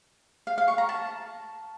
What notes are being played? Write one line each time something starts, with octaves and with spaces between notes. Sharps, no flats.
F5
F5
C#6
A#5
A5